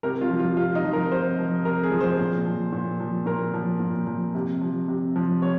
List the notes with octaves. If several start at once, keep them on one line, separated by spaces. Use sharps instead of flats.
C3 A#4
F4
F3
F4
C3 F4
D#4
F3
A#4
C3 C5
F3
C3 A#4
G#4
F3
C5
A#2
F3
A#2
F3
A#2 A#4
F3
A#2
F3
C3
F3
C3
F3
C3 C#5